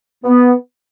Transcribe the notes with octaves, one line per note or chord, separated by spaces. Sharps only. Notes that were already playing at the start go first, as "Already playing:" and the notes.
B3